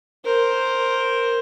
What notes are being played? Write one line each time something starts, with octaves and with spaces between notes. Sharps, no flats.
A#4 C5